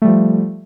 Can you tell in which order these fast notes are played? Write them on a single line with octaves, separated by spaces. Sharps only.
A3 G3 F3